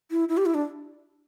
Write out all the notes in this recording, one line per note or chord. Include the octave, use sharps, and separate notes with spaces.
E4
E4
G4
E4
D4